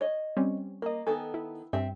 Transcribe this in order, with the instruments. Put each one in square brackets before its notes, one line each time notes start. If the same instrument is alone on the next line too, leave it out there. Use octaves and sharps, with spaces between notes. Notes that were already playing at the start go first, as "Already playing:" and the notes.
[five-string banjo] C#5 D#5
[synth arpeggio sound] G3 C4 C#4
[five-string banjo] A#3 [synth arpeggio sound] A#4 D#5
[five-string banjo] D#3 B3 A4 [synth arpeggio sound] G#5
[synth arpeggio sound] E4
[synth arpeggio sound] G2 [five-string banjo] C4 E5